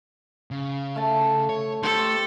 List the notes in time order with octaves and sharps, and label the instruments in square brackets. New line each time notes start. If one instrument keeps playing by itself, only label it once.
[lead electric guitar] C#3
[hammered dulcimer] A3 A5
[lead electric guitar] C#5
[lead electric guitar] A3 [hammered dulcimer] G4 C5 [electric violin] A4